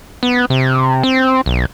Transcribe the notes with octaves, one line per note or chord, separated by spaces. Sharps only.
B3
C3
C4
B1